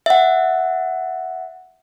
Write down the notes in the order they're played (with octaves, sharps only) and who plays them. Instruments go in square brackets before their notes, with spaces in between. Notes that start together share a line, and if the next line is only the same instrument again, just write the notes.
[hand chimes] E5 F#5